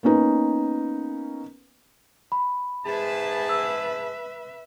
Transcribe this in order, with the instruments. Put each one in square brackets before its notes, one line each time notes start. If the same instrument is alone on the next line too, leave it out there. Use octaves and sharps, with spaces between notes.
[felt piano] A#3 B3 C#4 D#4 B4
[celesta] B5
[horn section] G#2 G#4 A5 [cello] B4 E5
[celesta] E6